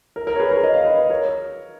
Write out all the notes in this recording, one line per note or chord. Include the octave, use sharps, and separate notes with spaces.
A#4
A#4
C#5
G#4 B4
A#4 C#5
D#5
F5
B4 D#5
A#4 C#5